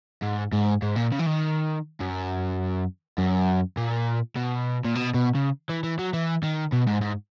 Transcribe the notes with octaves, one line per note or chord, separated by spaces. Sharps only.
G#2
G#2
G#2
A#2
C#3
E3
D#3
F#2
F#2
A#2
B2
A#2
B2
B2
C#3
E3
E3
F#3
E3
D#3
B2
G#2
G#2